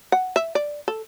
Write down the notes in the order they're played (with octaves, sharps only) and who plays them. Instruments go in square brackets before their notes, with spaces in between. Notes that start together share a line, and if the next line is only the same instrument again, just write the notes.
[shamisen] F#5
E5
D5
A4